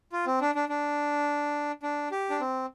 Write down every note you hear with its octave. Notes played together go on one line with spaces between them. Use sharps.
F4
C4
D4
D4
D4
D4
G4
D4
C4